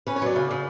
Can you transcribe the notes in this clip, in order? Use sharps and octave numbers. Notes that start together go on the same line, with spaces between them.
C#4 B4
C#5
F#3 D5
C#3
C#3